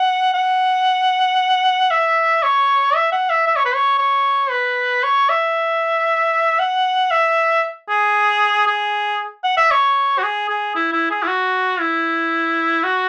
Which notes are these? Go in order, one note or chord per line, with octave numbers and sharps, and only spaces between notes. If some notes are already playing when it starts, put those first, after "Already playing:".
Already playing: F#5
F#5
E5
C#5
E5
F#5
E5
E5
C#5
B4
C#5
C#5
B4
C#5
E5
F#5
E5
G#4
G#4
F#5
E5
C#5
F#4
G#4
G#4
E4
E4
G#4
E4
F#4
E4
F#4